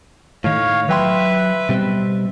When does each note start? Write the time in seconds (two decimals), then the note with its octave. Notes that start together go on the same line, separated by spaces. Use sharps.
0.44 A2 D#3 C#5 F5
0.89 F#3 B4 E5 G5 C6
1.69 B2 G3 C4